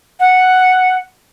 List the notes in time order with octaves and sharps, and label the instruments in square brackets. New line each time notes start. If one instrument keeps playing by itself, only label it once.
[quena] F#5